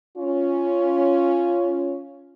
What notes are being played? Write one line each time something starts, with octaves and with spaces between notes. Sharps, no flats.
C#4 F4